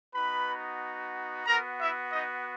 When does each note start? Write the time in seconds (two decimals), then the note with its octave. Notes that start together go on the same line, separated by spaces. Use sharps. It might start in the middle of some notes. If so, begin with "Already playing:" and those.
0.14 B3 D#4 F#4 B4 B5
1.46 B3 F#4 A#4 A#5
1.80 E4 E5
2.12 D#4 D#5